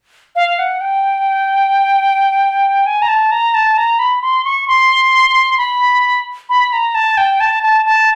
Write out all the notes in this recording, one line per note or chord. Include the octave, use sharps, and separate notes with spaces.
F5
F#5
G5
G#5
A#5
A5
A#5
A5
A#5
B5
C6
C#6
C6
B5
B5
A#5
A5
G5
A5
A5
A5